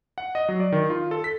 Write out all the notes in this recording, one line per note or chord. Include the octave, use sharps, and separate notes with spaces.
F#5
D#5
F#3
D5
D#3
F4
A4
B6